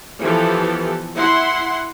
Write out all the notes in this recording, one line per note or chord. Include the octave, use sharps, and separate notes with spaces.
E3 F3 B3 G4 A4
E4 F#5 C6